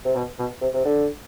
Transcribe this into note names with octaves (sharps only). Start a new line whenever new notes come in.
C3
B2
B2
C3
C3
D3